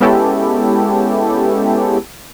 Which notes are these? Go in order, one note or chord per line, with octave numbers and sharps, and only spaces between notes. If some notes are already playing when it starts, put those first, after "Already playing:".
G#3 B3 C#4 E4 G4 A4